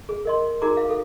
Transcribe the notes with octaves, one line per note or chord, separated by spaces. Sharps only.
G#4
A#4 D#5 C6
D#4 F#4 G#4 A#4 A#5 D6
F5
A4 F5